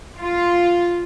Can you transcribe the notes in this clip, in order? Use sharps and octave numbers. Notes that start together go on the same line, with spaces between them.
F4